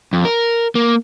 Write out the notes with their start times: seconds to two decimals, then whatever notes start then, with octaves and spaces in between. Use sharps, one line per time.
0.13 F2
0.25 A#4
0.75 A#3